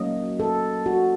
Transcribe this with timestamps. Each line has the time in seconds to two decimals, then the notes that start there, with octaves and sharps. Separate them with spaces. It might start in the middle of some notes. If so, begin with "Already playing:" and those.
Already playing: F#3 A#3 C#4 D#5
0.40 A4
0.86 F#4